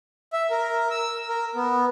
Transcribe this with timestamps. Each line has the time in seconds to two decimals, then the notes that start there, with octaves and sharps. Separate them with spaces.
0.33 E5
0.50 A#4
0.91 E6
1.29 A#4
1.55 B3